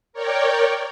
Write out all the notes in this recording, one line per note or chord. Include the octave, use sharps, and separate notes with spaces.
A#4 C#5 D5 G5